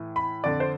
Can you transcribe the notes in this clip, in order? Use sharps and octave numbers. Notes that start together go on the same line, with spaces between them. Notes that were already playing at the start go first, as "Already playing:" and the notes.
Already playing: A2 E3
B5
F2 D3 D5
C5